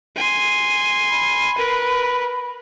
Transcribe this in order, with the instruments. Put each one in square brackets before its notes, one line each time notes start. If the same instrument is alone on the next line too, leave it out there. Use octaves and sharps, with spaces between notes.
[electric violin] G#5 C6
[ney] B5
[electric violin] A#4 B4